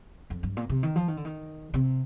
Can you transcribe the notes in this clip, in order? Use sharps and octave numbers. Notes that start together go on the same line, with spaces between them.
F2
G2
A#2
C3
D#3
F3
D#3
D3
D#3
C3